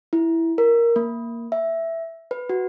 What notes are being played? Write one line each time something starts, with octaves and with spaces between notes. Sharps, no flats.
E4
A#4
A#3
E5
B4
F#4